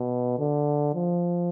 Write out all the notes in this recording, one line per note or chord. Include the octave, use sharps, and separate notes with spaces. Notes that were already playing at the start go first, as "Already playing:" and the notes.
Already playing: B2
D3
F3